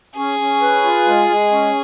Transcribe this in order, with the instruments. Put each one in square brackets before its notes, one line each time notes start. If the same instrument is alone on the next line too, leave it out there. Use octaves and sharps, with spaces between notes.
[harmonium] C#4 [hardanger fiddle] G#4
[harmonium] C#4
B4
F4
G#3
G#3
C#4